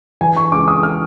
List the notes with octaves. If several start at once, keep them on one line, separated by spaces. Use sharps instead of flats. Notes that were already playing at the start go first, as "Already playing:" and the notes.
E3 G#5
C#6
C#2 D6
D#6
F6